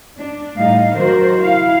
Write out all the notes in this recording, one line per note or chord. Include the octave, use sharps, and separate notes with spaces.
D4
A2 G3 D#4 F5
D#3 F#3 D4 F#4 A#4 C5
E4 F5